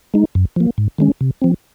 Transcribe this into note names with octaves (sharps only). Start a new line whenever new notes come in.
G#3 D#4
F#2
F3 A#3
G#2
D#3 G#3 C#4
C3
F3 C4